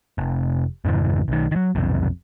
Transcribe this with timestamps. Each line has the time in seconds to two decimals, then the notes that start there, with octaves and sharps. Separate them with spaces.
0.18 F1
0.85 F2 G#2 C#3 E3
1.28 B1 D#3
1.51 D#3 F#3
1.75 F1 B1 F2